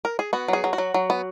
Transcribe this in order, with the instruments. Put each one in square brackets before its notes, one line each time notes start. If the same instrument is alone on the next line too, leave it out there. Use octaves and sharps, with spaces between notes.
[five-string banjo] A#4
G#4
B3 F#4
F#3 G#4
F#3
F#4
F#3
F#3
B3